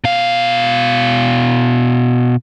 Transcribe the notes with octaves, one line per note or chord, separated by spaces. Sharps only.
B2 F5